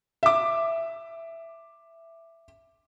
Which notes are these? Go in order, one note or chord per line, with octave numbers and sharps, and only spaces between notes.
E5 D6